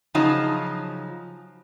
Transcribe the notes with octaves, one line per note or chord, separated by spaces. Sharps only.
C#3 F3 F#3 D#4 D#5 A5